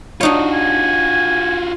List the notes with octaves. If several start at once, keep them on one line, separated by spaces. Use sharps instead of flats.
D4 D#4 F4 F#4 C#5
G#5